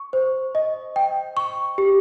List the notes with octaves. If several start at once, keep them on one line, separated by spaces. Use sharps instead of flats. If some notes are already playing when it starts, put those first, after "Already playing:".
Already playing: C#6
C5
D#5
G5
C#6
G4